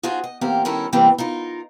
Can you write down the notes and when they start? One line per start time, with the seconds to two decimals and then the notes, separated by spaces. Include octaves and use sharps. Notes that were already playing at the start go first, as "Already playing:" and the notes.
0.03 D#4 F4 F#4 G#4 C5
0.24 D#5
0.41 E2 A#2 C4 G4 A#4 F5
0.65 G2 D#3 C#4 E4 A4 A#4
0.92 C3 E3 G3 A#3 C4 D4
1.18 D#4 F4 A#4